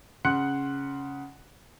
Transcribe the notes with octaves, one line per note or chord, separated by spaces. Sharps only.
C#3 F#5 C6 F#6 C#7